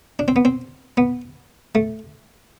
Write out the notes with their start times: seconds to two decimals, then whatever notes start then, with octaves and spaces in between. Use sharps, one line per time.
0.19 D4
0.28 C4
0.36 B3
0.45 C4
0.97 B3
1.75 A3